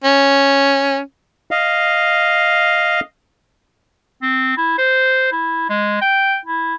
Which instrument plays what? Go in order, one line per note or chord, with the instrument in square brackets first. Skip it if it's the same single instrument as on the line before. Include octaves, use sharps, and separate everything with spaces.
[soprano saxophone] C#4
[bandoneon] D#5 F5
[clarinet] C4
E4
C5
E4
G#3
G5
E4